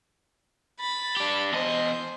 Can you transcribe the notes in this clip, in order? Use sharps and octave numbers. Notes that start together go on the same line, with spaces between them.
B5 A6
D4 G4
E2 C5 D#5